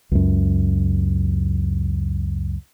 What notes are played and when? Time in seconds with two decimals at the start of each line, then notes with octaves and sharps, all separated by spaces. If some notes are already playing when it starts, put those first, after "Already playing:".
0.11 C#2 F#2